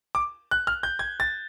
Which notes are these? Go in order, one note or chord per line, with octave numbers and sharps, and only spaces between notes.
D6
F#6
F6
G6
G#6
A6